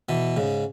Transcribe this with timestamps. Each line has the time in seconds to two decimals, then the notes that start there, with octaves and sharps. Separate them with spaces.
0.09 B2 E3
0.37 G#2 C#3